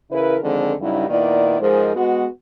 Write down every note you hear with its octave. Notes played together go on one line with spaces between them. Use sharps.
C#3 E3 E4 A#4 B4
D3 D#3 F3 G#3 C4 A4
G2 C#3 F#3 G3 D#4 E4
A#2 D#3 B3 E4 D5
G#2 F3 G#3 G#4 A#4 C5
G#3 B3 F#4